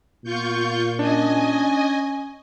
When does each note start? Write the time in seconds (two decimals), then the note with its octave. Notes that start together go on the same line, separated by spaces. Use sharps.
0.24 A#2 B3 F4 C#6 G6
0.99 C#4 D4 D#5 G#5